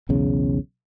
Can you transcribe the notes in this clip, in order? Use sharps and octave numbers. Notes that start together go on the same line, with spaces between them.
B1 E2 C#3